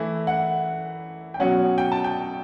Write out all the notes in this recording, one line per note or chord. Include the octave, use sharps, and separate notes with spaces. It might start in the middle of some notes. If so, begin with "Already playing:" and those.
Already playing: E3 A3 E4
F#5
G5
B2 F#3 C#4 F#5
G5
A5
G5